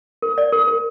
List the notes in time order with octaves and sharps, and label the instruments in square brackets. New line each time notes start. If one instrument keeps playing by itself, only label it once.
[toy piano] A#4
D5
A#4
A#4